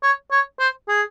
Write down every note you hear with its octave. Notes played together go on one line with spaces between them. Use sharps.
C#5
C#5
C5
G#4